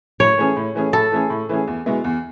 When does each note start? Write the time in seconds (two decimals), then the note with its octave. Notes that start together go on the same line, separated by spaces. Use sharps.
0.20 A2 C#5
0.38 E3 A3 C#4 G#4
0.57 A2
0.75 E3 A3 C#4 G#4
0.93 A2 A4
1.12 E3 A3 C#4 G#4
1.30 A2
1.49 E3 A3 C#4 G#4
1.67 E2
1.86 B2 G#3 B3 E4
2.04 E2